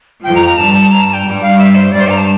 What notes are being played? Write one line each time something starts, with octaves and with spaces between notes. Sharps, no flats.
F2 F3 G5
A#5
A#5
G2 G3 A5
A5
A#5
A5
G5
G2 G3
F5
E5
C5
G2 G3 D5
C5
A#5
A5